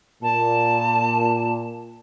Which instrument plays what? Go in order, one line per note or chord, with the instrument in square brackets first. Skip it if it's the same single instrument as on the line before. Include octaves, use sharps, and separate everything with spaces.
[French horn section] A#2 [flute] A5